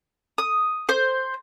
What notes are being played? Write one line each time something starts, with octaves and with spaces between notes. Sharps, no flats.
D#6
C5